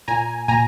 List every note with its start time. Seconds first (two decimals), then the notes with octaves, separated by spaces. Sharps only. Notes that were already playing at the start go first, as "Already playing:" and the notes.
0.08 A#2 G#5 A#5
0.48 A#2 G#5 A#5